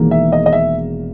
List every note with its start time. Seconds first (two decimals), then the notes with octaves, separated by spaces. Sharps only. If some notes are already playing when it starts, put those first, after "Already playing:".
Already playing: E1 E2 D#3 A#3
0.11 E5
0.32 D#5
0.46 D#5
0.53 E5